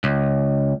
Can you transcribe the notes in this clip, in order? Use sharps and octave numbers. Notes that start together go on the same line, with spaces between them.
C#2